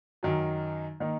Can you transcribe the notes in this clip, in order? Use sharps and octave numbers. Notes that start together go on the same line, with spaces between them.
F#2 D#3 F#3
D#3 A#3 D#4